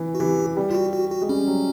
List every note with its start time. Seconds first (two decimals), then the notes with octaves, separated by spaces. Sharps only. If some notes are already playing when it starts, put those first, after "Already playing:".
Already playing: E3
0.15 F#4
0.20 E3 G4
0.57 G3
0.71 F4
0.75 F#4
0.93 F#4
1.11 F#4
1.21 G#3
1.29 G3 C#4
1.48 F#3